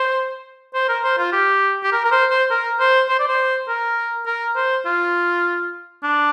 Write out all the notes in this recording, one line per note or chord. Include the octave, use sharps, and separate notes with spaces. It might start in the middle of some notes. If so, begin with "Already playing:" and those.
Already playing: C5
C5
A#4
C5
F4
G4
G4
A#4
A#4
C5
C5
A#4
C5
C5
D5
C5
A#4
A#4
C5
F4
D4